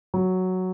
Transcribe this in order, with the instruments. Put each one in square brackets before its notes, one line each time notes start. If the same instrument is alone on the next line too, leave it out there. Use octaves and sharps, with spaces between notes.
[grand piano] F#3